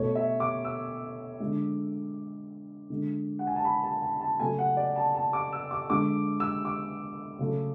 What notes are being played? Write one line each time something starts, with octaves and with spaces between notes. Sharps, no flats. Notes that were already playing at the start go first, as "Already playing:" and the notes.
Already playing: B2 A3 C#5
E5
D6
E6
D3 G#3
D3 G#3
F#5
G#5
A5
B5
A5
A5
A5
C#3 F#3 A3 G#5
F#5
D5
A5
A5
D6
E6
D6
D3 G#3 D6
E6
D6
C#3 F#3 A3